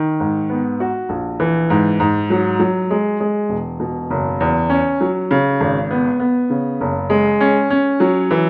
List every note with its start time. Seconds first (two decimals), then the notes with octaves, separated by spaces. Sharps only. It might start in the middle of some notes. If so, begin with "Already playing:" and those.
Already playing: D#3
0.20 G#2
0.49 B3
0.80 F#4
1.09 A#1
1.40 E3
1.70 G#2
2.00 G#2
2.30 F#3
2.60 F#3
2.90 G#3
3.20 G#3
3.49 E1
3.80 B2
4.10 F#1
4.40 E2
4.70 C#4
5.01 F#3
5.31 C#3
5.61 G#1
5.91 B3
6.20 B3
6.50 C#3
6.81 F#1
7.10 G#3
7.40 C#4
7.70 C#4
8.00 F#3
8.31 E3